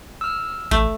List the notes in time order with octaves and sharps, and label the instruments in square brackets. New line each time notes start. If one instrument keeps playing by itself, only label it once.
[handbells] E6 F6
[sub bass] A1 [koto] A3